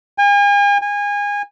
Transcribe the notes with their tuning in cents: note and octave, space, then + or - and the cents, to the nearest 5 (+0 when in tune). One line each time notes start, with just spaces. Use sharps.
G#5 -40
G#5 -25